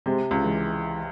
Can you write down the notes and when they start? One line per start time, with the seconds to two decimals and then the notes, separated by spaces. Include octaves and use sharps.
0.06 C3 G#3 C4
0.31 C#2
0.43 E3 G#3